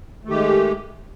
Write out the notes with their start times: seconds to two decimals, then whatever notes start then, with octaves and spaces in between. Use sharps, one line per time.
0.25 A3
0.27 D#3
0.30 G4
0.33 G#3